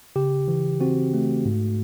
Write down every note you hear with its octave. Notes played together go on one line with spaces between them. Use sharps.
C#3 G4
E3
C4 F#4
A3
G#2